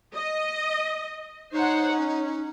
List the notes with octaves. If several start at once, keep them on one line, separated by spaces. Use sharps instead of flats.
D#5
D#4 C5 C#5 F#5
C#4